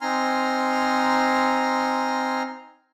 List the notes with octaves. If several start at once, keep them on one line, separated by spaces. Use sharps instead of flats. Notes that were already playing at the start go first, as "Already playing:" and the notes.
C4 D#4 G#5 A#5 C6 F6